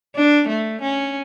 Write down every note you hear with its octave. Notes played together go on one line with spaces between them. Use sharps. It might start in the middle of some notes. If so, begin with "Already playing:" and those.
D4
A3
C#4